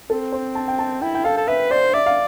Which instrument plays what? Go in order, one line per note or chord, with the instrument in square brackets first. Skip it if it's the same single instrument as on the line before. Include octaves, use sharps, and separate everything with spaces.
[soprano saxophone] C4 [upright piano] A4
[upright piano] C5
A5
G5
A5
[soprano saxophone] E4 [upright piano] G5
[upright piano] G5
[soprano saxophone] A4 [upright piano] F5
[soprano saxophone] A4
[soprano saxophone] B4 [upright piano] E5
[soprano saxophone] C5 [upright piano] D5
[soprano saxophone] D5 [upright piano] E5
[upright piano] F5